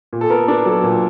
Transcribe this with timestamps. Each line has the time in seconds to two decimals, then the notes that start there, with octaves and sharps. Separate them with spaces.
0.13 A#2
0.21 A4
0.30 B3 A#4
0.48 D4 A#4
0.66 F#3 A4
0.83 A#2